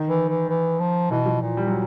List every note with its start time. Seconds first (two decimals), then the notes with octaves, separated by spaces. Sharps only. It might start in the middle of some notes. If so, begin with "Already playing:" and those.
Already playing: D#3
0.09 E3
0.29 E3
0.49 E3
0.80 F3
1.11 B2 E3
1.26 F3
1.41 A#2
1.57 G3
1.67 F#3